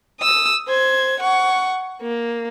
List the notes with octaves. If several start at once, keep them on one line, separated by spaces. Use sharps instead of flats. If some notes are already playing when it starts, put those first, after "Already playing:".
D#6 E6
C5 G#6
F#5 C#6
A#3